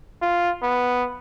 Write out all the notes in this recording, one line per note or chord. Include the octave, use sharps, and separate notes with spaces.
F4
B3